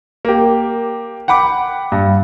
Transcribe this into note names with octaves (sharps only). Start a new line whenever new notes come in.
A#3 G4
F#5 G5 B5 D6
G2